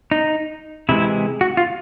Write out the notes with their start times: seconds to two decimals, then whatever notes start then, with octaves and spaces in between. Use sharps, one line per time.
0.11 D#4
0.89 C3 E3 G#3 E4
1.41 F#4
1.57 F4